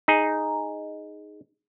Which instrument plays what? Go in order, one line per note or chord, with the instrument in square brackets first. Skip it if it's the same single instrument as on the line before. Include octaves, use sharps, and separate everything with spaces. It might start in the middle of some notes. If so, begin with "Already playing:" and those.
[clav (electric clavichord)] D#4 G#4